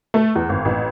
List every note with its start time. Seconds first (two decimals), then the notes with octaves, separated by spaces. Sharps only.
0.14 A3
0.35 E2
0.49 G#1
0.65 A1